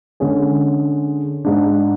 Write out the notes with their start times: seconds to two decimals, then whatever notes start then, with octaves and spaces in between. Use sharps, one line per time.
0.20 D3 G#3 C#4 G#4
1.45 G#2 G#3 D4